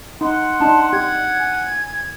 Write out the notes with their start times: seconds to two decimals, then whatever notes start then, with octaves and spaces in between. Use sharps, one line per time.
0.21 D#4 F#5 C6
0.60 D4 D#4 A5
0.93 G4 G#6
1.38 G#5